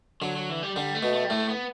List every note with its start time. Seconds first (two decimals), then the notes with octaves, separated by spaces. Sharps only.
0.22 D3 F#3
0.36 F#3
0.49 E3
0.63 G3
0.76 D3 G3
0.95 A3
1.03 B2
1.13 A3
1.24 G3
1.30 A2 A3
1.49 B3